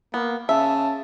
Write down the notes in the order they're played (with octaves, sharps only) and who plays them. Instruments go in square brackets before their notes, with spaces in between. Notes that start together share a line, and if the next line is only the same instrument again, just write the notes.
[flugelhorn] A#3 [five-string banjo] B3
[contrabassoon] C#3 [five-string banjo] E5 [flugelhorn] A5